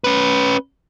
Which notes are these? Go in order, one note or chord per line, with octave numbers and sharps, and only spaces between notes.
C#4 B4